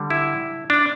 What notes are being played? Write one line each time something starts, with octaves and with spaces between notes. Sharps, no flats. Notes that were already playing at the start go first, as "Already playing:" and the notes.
Already playing: D3 G3
E4
D4